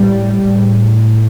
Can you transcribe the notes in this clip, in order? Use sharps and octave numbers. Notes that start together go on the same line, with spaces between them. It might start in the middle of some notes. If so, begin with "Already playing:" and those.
Already playing: A2 G3
A2